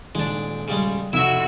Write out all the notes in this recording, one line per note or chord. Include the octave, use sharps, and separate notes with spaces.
D#1 G#3 D4
C#3 G3 G#3
F1 B2 E4 F#4 E5 E6